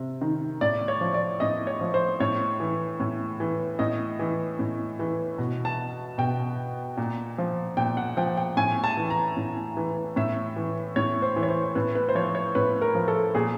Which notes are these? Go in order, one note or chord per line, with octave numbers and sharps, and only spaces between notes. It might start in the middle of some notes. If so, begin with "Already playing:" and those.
Already playing: C3
D#3
A2 D5
C#5
F3
D5
A2 D#5
C#5
F3
C5
A2 C#5
E3
A2
E3
A2 D#5
E3
A2
E3
B2
A5
B2 G5
A#2
F3
A#2 G5
F#5
F3 G5
G5
A2 G#5
A5
E3
A#5
A2
E3
A2 E5
E3
A2 C#5
C5
E3
C#5
C5
A2 B4
B4
C5
F3 C#5
C#5
A2 B4
A#4
F3
A4
A#2 G#4